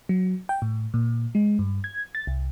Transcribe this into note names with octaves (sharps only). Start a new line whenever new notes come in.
F#3
G5
A2
A#2
G#3
G2
G#6
A6
C2